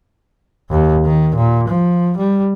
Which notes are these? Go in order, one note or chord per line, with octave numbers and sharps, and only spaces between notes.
D#2
D#3
A#2
F3
G3